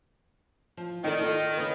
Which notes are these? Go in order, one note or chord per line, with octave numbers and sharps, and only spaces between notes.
F3
D#3 D#4 A4 D5
F4 A4
C#3 B4